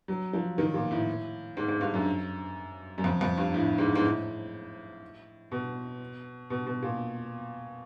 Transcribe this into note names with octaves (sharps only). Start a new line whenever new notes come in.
F#3
F3
D#3
A#2
A2
G#2
G#2
G2
F#2
F#2
F2
F2
G2
A2
G#2
G#2
A2
B2
B2
B2
A#2